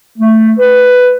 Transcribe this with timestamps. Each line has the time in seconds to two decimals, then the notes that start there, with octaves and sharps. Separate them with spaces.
0.18 A3
0.59 B4